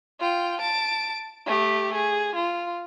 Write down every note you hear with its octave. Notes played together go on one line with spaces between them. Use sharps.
F4 G5
A5 D7
A3 G4
G#4
F4